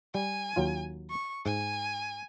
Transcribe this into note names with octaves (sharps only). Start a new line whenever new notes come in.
G3 G#5
D#2 F#3 F4
C#6
G#2 G#5